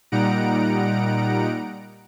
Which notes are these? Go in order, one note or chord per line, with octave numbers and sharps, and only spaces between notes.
A#2 G3 D#4 F#5 A#5 D7